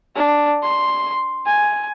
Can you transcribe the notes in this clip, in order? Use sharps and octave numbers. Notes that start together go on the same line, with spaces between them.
D4
C6
G#5